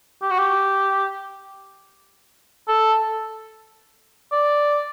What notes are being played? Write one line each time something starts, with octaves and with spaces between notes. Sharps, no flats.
G4
F#4
G4
A4
D5